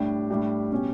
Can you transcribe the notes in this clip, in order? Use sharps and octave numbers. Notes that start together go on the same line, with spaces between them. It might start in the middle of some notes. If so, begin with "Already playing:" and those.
Already playing: A2 G3 D4 G4
A2 G3 D4 G4
B2 G3 C#4 G4